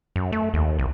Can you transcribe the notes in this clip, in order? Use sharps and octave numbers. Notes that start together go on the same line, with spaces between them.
F#2
A3
D#2
C2